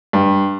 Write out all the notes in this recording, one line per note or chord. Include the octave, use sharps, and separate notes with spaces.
G2